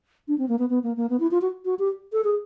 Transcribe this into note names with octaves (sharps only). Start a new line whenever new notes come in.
D4
C4
A#3
B3
B3
A#3
A#3
B3
E4
F4
F#4
F#4
G4
A4
G#4